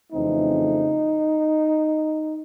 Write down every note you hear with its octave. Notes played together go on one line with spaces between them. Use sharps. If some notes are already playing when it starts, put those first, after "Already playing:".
F2 C#3 E3 A3 C4 D#4